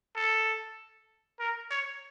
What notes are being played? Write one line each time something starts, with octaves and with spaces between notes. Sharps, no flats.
A4
A#4
C#5